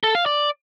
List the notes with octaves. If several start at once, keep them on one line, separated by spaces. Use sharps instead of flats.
A4
F5
D5